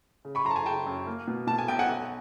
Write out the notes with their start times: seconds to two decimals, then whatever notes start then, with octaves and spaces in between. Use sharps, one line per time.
0.25 C#3
0.35 B5 C#6
0.45 F#2 A#5 C6
0.51 A5
0.56 G#5 A#5
0.66 C#3 G5 A5
0.86 F#2
1.07 A#3
1.28 B2
1.47 B2 A5
1.58 G#5
1.68 B1 G5
1.79 F#5 G#5
1.89 B1